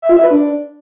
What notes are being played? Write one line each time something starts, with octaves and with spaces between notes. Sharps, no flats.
E5
F4
E5
B4
D4